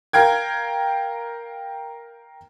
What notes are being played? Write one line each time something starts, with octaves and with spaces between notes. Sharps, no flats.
A#4 F5 G5 G#6